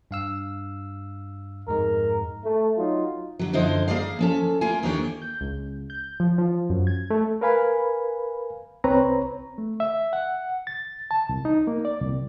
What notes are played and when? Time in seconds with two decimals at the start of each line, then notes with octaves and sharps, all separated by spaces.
0.11 G2 F5 E6
1.68 F2 G#2 G#3 A#4
2.45 A3
2.78 F#3 D#4 F4
3.39 D3 F#3
3.53 F#2 D3 F3 E4 C5 D#5
3.88 A#3 G#4 D5 F5
4.19 F3 C#4 A4
4.61 A3 A#3 F4 G#5
4.83 D#2 D#3 A#3 D4 G4 C#5
5.22 G6
5.41 C#2
5.90 G6
6.20 F3
6.38 F3
6.70 F#2
6.87 G#6
7.10 A3
7.41 A#4 B4 F5 G#5 B5
8.84 C2 C4 B4 C#5 A#5
9.58 A3
9.80 E5
10.13 F#5
10.67 A6
11.11 A5
11.29 C2
11.45 D#4
11.67 A#3
11.85 D5
12.01 C2